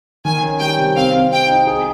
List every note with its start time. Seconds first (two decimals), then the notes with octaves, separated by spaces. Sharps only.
0.25 D#3 G#5
0.43 C#4
0.61 G3 G5
0.78 C3
0.96 C4 F5
1.14 C4
1.32 D#4 G5
1.49 D#4
1.67 G#4